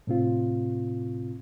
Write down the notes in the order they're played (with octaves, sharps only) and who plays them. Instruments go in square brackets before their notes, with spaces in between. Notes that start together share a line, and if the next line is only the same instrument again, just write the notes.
[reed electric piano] A2 C3 C4 F4